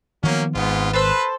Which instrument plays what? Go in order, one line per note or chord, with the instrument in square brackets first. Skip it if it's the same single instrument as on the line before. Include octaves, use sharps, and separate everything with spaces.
[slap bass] D#3 F3 B3 [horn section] F#3 A#3 C#4
[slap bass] G#1 [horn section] G#2 B3 F4
[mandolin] A4 C5 E6 [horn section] B4